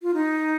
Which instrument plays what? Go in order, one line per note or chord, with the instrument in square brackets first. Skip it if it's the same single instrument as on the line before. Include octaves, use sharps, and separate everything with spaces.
[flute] F4
D#4